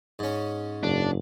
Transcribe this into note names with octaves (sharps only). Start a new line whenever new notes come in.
G#2 C#4
F#1 D4